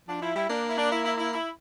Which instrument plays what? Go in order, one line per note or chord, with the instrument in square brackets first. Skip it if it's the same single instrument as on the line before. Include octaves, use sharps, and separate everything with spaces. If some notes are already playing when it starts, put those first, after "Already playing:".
[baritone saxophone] F3 [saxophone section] D4
[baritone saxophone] F3 [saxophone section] E4
[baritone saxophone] G3 [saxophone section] E4
[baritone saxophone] A#3 [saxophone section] D4
[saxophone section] E4
D4
E4
E4
E4
E4